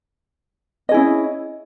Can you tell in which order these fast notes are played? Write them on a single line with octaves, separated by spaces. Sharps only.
D#5 G#4 E4 C#4